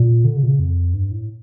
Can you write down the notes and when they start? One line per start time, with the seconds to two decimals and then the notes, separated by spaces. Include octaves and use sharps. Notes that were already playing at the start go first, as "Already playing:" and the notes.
Already playing: A#2
0.25 D3
0.37 C#3
0.43 A#2
0.48 C#3
0.59 F2
0.94 G2
1.11 A2